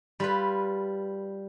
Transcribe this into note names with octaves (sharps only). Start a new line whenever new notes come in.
G3 F4 B4